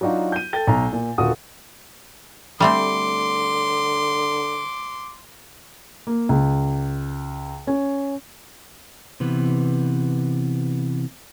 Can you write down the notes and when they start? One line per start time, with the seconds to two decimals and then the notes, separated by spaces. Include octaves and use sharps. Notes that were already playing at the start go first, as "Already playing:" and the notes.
0.01 F#3 D4 D#4 F4 F#4
0.32 G6 D#7
0.53 A4 G5 A6 G7
0.67 B1 A#5
0.93 A#2
1.18 D#1 D3 F4 F#4 D#6
2.60 D3 G3 A3 C4 C6 D6
6.07 A#3
6.29 C#2
7.67 C#4
9.20 C3 E3 B3